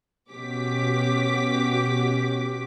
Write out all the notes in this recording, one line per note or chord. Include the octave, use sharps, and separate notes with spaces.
B2 C#4 F#4 G4 D6 B6